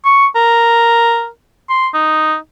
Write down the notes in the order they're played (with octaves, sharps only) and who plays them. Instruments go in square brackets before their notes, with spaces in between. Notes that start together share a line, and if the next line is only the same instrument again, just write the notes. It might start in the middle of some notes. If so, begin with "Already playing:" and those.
[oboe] C#6
A#4
C6
D#4